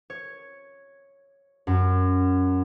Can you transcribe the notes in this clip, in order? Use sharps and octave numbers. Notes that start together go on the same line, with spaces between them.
C#5
F#2